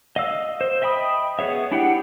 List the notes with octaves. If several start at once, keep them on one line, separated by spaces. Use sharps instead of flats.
D#5 F5 E6
C5
D#5 E5 G5 B5 D#6
B3 G#4 C#5 E5
D4 E4 G4 F#5 G5